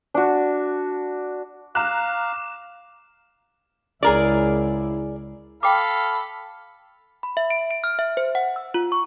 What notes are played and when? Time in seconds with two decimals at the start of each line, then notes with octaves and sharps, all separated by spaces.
0.14 D4 F#4
1.75 F5 A#5 D6 F6 F#6 E7
4.03 C#2 E4 G#4 A#4 D5
5.63 A4 F5 G5 B5 D6
7.23 B5
7.37 E5
7.50 D7
7.71 D7
7.84 F6
7.99 E5
8.17 C5
8.35 F#5
8.56 E6
8.74 F4
8.92 C#6